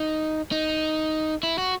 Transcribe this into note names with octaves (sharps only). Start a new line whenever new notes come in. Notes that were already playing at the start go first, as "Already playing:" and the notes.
Already playing: D#4
D#4
E4
F#4